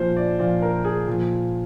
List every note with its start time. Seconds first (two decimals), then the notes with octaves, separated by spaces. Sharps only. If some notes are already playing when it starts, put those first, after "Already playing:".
Already playing: A#2 F3 C5
0.17 D5
0.39 A#2 F3 D5
0.62 A#4
0.85 G#4
1.08 A#2 F3